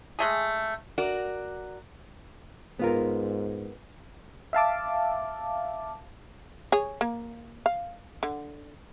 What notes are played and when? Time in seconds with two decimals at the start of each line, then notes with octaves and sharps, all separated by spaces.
0.19 G#3 A3 G#4
0.98 F#4 A#4 D5
2.79 G#2 B3 F4 A#4
4.53 E5 F5 A5 D6
6.72 G#4 C#5
7.01 A#3
7.66 F5
8.23 D3